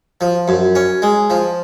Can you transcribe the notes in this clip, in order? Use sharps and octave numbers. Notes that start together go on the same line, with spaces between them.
F3
F#2
C#4
G#3
F3